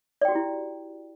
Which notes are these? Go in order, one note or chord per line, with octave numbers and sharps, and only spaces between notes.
E4 F#4 G4 D5 G5